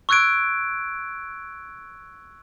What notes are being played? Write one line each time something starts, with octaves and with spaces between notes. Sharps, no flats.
C#6 E6 F#6 G#6 D7